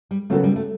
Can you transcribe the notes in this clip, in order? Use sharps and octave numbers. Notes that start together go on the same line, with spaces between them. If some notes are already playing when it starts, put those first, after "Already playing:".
G3
C#3 F#3 A3 B3 F#4 A4
G3
A3